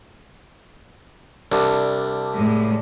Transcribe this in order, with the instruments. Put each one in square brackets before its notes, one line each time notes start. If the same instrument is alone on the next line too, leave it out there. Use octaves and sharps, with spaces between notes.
[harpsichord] C2 [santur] D4
[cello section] A2 G#3